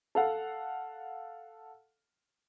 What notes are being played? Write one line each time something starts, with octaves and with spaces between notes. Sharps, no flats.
A4 F5 F#5